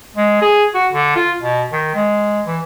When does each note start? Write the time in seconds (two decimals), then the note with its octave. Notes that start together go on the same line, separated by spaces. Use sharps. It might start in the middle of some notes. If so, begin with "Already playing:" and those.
0.16 G#3
0.42 G#4
0.74 F#4
0.92 D3
1.16 F4
1.41 B2
1.72 D#3
1.95 G#3
2.46 E3